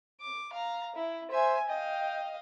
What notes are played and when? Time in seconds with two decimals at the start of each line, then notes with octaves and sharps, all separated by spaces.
0.21 D6
0.52 F5 A#5
0.95 E4
1.31 C5 E5 G#5
1.68 D#5 F5 G5